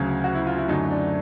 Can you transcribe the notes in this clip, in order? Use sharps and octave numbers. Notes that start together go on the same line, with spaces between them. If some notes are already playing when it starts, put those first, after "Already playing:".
Already playing: D2 C#3 F#3
F#4
E4
F4
E4
F#2 D3 F#3 A3 D#4
D4